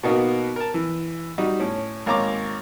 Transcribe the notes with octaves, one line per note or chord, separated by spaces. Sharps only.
B2 A#3 B3 D#4 F#4 A#4
A#4 A5
E3
G3 D#4 F#4
A2 C#4
G#1 A#3 C#5 A#5 D6